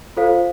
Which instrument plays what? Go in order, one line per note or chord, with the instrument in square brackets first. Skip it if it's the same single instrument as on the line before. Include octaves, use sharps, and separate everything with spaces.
[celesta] F4 A4 C5 F5